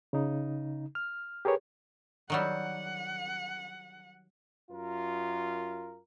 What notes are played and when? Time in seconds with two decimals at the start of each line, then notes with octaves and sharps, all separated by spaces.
0.13 C#3 D#4
0.95 F6
1.45 G4 G#4 A#4 B4 C#5
2.30 D#3 F#3 G3 F#5
4.71 F#2 F4 A#4